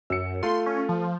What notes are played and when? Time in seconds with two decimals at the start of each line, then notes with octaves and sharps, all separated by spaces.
0.10 F#2 E6 C#7
0.43 A3 F4 C6
0.66 C#4
0.89 F3